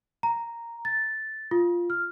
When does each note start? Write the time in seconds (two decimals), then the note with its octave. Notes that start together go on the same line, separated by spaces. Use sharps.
0.23 A#5
0.85 A6
1.51 F4
1.90 F6